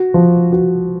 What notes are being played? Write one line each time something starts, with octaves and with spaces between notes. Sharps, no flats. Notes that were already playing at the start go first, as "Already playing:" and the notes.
Already playing: F#4
F3
F#4